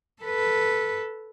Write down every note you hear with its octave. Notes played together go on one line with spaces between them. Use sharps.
A4 B4